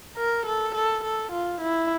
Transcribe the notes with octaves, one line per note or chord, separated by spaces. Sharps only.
A#4
A4
A4
A4
F4
E4